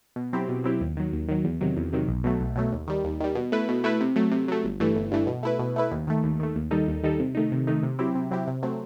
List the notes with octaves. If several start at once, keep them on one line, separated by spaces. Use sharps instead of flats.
B2
F#3 C4 E4 G4
B2
F#3 C4 E4 G4
D#2
D#3 F#3
D#2
D#3 F#3
E2
C3 D#3 F#3
E2
C3 D#3 F#3
B1
B2 F#3 A3
B1
B2 F#3 A3
D#2
D#3 G3
D#2
D#3 G3
B2
A3 E4 B4
B2
A3 E4 B4
C3
F#3 A3
C3
F#3 A3
G1
G2 E3 A3
G1
G2 E3 A3
B2
A3 E4 B4
B2
A3 E4 B4
D#2
D#3 A3
D#2
D#3 A3
D#2
D#3 G3 D#4 A4
D#2
D#3 G3 D#4 A4
C3
D#3 A3 D#4
C3
D#3 A3 D#4
C3
F#3 C4 E4 G4
C3
F#3 C4 E4 G4
C3
F#3 A3 C4